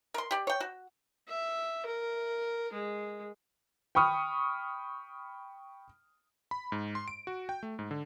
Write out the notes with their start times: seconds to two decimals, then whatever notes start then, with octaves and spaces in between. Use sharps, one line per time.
0.14 A#4 C6
0.31 G4 D5
0.47 C#5 G5
0.60 F#4
1.28 E5
1.85 A#4
2.73 G#3
3.95 G5 B5 C#6 D#6 F6
6.51 B5
6.72 G#2
6.95 C6
7.08 D7
7.27 F#4
7.49 G5
7.63 A3
7.79 G#2
7.91 D3